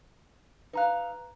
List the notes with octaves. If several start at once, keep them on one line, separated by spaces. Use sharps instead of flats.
D#4 B4 F5 A#5 F#6